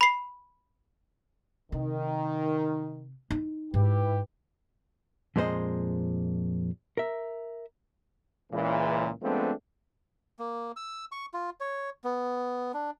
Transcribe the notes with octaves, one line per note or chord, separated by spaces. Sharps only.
B5 C7
C3 D#3
D#4
G#2 E4 G4 B4
F2 A#2 G#3 D4 C5 D#5
A#4 E5
C#2 A#2 E3
F3 G#3 A3 B3 C4 D4
A#3
E6
C#6
F4
C#5
B3
D4